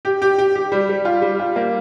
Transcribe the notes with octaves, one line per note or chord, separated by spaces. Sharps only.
G4
G4
G4
G4
G3
G3
F4
G3
F4
A#3